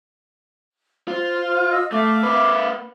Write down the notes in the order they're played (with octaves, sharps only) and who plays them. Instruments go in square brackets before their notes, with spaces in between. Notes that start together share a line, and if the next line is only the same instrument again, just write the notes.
[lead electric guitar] F4 [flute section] C5
[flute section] D#5 E6
[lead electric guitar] A3 [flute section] E5 F5 D6
[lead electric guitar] A#3 B4